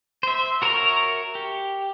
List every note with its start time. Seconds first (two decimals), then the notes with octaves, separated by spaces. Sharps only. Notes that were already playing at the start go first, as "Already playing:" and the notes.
0.23 C5 E5
0.62 F#4 A#4 C#5 E5 A#5
1.35 G4